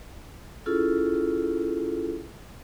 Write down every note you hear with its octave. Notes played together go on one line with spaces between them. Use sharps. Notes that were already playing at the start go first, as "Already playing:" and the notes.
C#4 E4 F4 G#4 A4